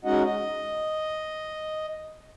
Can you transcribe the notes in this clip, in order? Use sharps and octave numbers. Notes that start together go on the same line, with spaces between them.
G#3 C#4 D#4 F#4 D#5 F#5
D#5